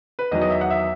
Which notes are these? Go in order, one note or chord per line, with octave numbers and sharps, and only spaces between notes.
B4
E2 D#3 F#3 B3 D#5
D#5
E5
F#5
E5